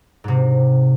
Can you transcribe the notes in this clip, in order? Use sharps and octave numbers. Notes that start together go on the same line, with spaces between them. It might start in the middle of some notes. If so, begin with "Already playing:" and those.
G#2 C3